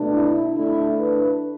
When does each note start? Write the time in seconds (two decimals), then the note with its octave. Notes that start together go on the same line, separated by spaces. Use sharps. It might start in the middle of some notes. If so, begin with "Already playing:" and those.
Already playing: B2 A3 D4
0.14 E4
0.56 D3 A3 D4 E4
1.00 B4